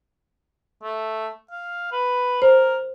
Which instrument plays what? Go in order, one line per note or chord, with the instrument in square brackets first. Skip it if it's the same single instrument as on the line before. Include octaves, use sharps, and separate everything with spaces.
[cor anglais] A3
F5
B4
[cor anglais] A#4 [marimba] C5